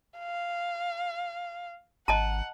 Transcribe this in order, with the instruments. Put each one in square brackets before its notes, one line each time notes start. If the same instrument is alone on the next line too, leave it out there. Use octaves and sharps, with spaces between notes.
[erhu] F5
[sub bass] G#1 [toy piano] D#5 A5 A#5 [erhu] F#5